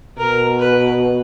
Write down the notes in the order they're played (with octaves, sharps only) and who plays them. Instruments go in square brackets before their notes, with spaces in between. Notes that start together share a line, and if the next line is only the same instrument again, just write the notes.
[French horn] B2 [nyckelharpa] A#4
[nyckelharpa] B4